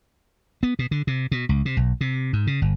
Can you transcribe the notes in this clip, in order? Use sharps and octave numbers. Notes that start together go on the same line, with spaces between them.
B3
B2
D3
C3
B2
C#2
C3
B1
C3
G#2
C#3
G1